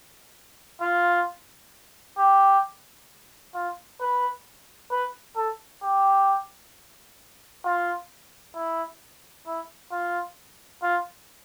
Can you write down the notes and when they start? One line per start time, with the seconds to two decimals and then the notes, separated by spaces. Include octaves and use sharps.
0.81 F4
2.18 G4
3.54 F4
4.01 B4
4.91 B4
5.36 A4
5.83 G4
7.64 F4
8.55 E4
9.47 E4
9.92 F4
10.82 F4